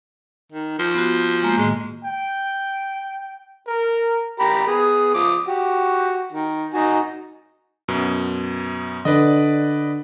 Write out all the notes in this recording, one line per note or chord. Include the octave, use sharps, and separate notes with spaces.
D#3
F3
B3 F#4
G#3 A#3
A2 D#3 G#3
G5
A#4
G4 A#4 B5
B3 G#4
F3 D6 D#6
F#4 G4
D#3
D#4 F#4 G#5
F#2 B2
D3 B4 D5 D#5